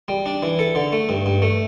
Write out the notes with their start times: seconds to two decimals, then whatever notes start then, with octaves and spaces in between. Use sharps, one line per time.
0.08 G3
0.26 D4
0.43 E3
0.59 A4
0.75 D3
0.92 A3
1.09 G2
1.26 G2
1.42 A3